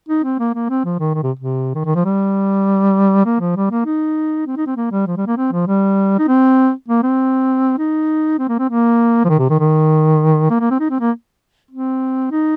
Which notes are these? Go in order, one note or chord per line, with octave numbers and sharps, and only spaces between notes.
D#4
C4
A#3
A#3
C4
F3
D#3
D#3
C3
C3
D#3
D#3
F3
G3
A#3
F3
G3
A#3
D#4
C4
D#4
C4
A#3
G3
F3
G3
A#3
C4
F3
G3
D#4
C4
A#3
C4
D#4
C4
A#3
C4
A#3
F3
D#3
C3
D#3
D#3
A#3
A#3
C4
D#4
C4
A#3
C4
D#4